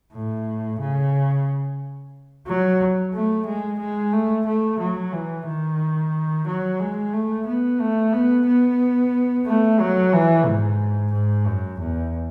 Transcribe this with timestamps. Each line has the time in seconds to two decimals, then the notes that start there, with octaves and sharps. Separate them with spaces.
0.13 A2
0.80 C#3
2.47 F#3
3.13 A3
3.46 G#3
3.79 G#3
4.13 A3
4.46 A3
4.79 F#3
5.13 E3
5.47 D#3
6.47 F#3
6.80 G#3
7.13 A3
7.46 B3
7.80 A3
8.13 B3
8.47 B3
9.46 A3
9.80 F#3
10.14 E3
10.46 G#2
11.13 G#2
11.47 F#2
11.80 E2